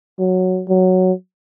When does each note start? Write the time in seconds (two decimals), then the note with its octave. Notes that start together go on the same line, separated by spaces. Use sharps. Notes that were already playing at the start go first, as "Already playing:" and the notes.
0.19 F#3
0.69 F#3